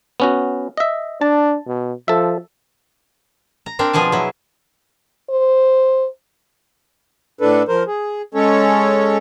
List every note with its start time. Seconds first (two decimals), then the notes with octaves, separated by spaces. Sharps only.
0.20 B3 C#4 F#4
0.77 D#5 E5
1.21 D4 A5
1.67 B2
2.08 F3 A4 E5
3.66 A#5
3.79 C4 D4 A#4
3.93 B2 F3 G#4 G#5 A5
4.12 F#3 E4
5.30 C5
7.41 A2 D4 A4 B4
7.68 F3 A#4 C5
7.87 G#4
8.34 G#3 C#4 A4 C#5